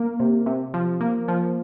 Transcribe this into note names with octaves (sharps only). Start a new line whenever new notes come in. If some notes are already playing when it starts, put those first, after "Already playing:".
Already playing: A#3
C3
C3
F3
A#3
F3